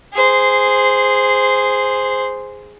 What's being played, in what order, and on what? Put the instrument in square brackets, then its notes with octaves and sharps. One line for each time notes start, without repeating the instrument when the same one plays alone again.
[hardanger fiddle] G#4 C5